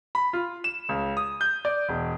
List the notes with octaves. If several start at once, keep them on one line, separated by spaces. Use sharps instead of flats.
B5
F4
E7
C#2
D#6
G6
D5
E1